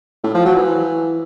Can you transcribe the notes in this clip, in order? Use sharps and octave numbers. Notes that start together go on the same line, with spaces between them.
A2
F3
F#3
E3